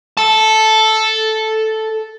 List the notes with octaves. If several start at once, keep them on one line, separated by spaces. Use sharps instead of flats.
A4 A5